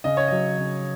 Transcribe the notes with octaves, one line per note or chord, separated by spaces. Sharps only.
C#3 D#5
C#5
F#3 D#5
C#3